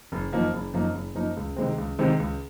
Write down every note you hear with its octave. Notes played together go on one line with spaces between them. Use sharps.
F#1
F#2 F3 A#3 D#4
F#1
F#2 F3 A#3 D#4
F#1
F#2 F3 A#3 D#4
C#2
C3 D#3 G#3 C4
C#2
C3 D#3 G#3 C4
C#2